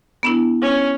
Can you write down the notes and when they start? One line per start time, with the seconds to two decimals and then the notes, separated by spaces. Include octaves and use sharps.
0.23 B3 D4 E4
0.62 C#4